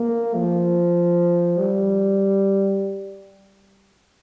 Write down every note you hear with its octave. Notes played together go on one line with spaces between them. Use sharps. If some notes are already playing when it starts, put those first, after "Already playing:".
Already playing: A#3
F3
G3